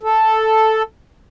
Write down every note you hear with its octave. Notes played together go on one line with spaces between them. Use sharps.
A4